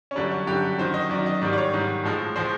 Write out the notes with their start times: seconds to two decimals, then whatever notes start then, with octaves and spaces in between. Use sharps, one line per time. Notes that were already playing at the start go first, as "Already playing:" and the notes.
0.11 C#4
0.15 F#2 D3 G3 D4
0.31 C#4
0.47 F#2 D3 G3 G4
0.78 F#2 D#3 F#3 C5
0.94 D#5
1.09 F#2 D#3 F#3 D5
1.26 D#5
1.41 G#2 D#3 G3 D5
1.53 D5
1.58 C#5
1.73 G#2 D#3 G3
2.04 A2 F3 G#3
2.36 A2 F3 G#3 C5